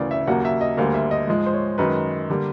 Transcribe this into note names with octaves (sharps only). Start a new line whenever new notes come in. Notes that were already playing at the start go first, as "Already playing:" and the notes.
Already playing: D2 C#3 E3 A#4 D5
E5
D#2 C#3 F#3 A#3 F#5
E5
D#5
D2 D3 G3 A#3 F5
E5
D#5
G#2 F3 G#3
C5
C#5
F#2 D#3 G#3 B4
D3 G3 A#3